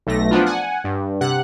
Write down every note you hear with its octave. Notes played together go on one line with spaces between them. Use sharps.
B1 A3 A#6
F3 B3 D4 F4
F#5 G#5
G2
C3 F#5 F#6